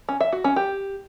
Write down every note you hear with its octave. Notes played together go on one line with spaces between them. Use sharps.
C#4
E5
F#4
C#4
G4